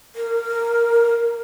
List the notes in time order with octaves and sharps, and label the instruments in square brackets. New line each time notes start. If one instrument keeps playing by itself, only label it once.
[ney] A#4